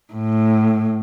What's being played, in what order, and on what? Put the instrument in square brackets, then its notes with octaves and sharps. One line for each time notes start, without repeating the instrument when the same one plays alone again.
[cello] A2